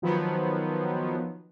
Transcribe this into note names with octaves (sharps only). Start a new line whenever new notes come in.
D#3 F3 F#3 B3